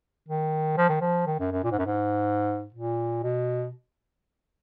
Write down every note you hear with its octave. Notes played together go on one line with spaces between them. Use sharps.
D#3
F3
D#3
F3
D#3
F#2
F#2
A#2
G#2
F#2
G#2
A#2
B2